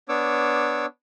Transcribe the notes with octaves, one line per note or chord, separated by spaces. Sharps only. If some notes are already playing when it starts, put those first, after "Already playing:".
B3 D4 C#5 D6 E6